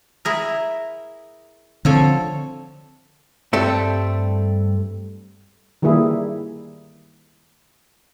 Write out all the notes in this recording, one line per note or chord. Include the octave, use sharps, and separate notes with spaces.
E4 G#4 A#4
D3 F3 C4 A4 C#5
G2 G3 A3 C4
D#3 G3 A#3 E4 G#4